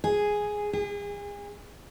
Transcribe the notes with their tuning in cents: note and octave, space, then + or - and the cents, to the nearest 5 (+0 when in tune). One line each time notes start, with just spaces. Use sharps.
G#4 +0
G#4 -35